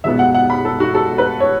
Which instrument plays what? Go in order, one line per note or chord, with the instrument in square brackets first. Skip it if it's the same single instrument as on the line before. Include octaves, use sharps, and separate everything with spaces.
[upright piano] C#2 B2 B3 E5
F#5
F#5
B5
A4
F#4
A4
B4
C#5